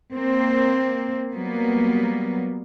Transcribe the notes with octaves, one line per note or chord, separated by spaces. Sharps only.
A#3 C4
F#3 G3 A#3 B3